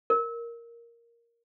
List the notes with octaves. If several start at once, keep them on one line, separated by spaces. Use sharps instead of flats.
A#4